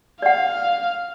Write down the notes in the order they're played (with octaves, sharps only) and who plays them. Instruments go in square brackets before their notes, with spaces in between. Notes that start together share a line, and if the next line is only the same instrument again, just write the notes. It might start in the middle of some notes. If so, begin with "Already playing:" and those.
[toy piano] D5 F#5 [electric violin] F5